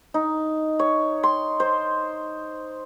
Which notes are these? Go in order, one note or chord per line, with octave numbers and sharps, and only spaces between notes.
D#4
C#5
C6
C5